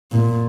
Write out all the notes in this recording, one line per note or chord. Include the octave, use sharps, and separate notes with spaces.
A#2